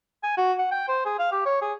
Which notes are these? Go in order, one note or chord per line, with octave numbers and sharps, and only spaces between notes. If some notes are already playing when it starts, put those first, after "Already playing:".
G#5
F#4
F#5
G5
C5
G#4
F5
G4
C#5
G#4